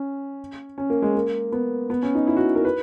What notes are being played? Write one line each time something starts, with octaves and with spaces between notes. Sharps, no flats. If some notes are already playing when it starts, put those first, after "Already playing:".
Already playing: C#4
C#4
A#3
G#3
A#3
B3
B3
C#4
D#4
E4
F#4
A#4
B4